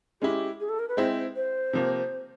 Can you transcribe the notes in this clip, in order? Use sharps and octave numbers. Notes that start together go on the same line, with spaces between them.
G#3 C#4 E4 G4
G#4
A4
A#4
B4
G#3 C4 E4 C5
C5
C3 F3 A#3